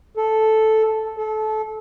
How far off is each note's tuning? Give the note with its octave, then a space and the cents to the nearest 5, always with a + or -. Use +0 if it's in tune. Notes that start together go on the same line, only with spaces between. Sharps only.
A4 -5
A4 -25